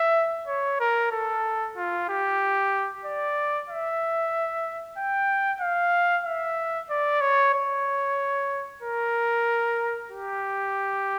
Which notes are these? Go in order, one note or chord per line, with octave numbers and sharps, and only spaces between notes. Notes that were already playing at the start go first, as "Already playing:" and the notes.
Already playing: E5
C#5
A#4
A4
F4
G4
D5
E5
G5
F5
E5
D5
C#5
C#5
A#4
G4